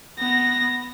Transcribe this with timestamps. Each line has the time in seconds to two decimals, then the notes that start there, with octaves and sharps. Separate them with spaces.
0.19 B3 A#6